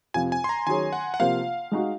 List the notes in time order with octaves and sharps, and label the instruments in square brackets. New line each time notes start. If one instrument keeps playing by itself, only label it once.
[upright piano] F2 C3 F3 C4 F4 [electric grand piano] G#5
[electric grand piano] G#5
C6
A#5
[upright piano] D#3 F#3 C#4 G#4 C#5 [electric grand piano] G#5
[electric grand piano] F#5
F#5
[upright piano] C3 F3 A#3 F4 C5 [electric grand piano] F5
[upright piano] G#3 D#4 F#4